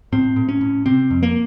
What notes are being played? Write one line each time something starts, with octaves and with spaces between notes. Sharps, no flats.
A2 C4
A2
C#4
A2
C3 C4
F2
A#3